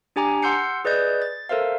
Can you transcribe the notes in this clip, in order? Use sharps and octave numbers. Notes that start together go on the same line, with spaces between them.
D4 G4 G#5 A#5 D6
F#5 C6 E6 G6 C7 C#7
G#4 B4 D5 D#5 G6
A6
A4 A#4 C5 E5 F5